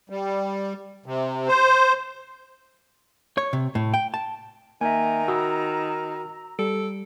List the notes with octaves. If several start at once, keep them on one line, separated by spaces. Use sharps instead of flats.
G3
C3
C5
C#5
C3
A2
G5
A5
D#3 A#3 E5 G#5 A#5
F#4 B5 D#6 E6
G3 A4 D7